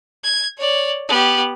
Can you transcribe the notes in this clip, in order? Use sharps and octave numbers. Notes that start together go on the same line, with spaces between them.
G#6
C#5 D5
B3 G4